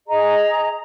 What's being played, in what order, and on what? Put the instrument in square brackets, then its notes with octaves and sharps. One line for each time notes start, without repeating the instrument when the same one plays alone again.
[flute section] G#4 D#5 A#5